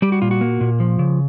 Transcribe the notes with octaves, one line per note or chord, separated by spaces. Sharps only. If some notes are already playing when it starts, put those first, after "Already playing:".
G3 G4
F#4
A#2 F4
F#4
A#3
A#2
F3
C#3